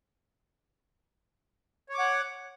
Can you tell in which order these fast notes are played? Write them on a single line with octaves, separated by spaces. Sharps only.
C#5 D6 F#5